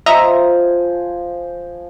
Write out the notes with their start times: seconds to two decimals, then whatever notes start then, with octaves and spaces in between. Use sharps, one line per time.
0.06 F3 C5 D#5 E5 G#5 A#5